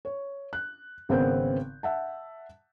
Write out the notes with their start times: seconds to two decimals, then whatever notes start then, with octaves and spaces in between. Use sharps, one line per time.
0.05 C#5
0.53 F#6
1.09 G#1 C#3 B3 C4 A#4 G6
1.83 E5 F#5 A5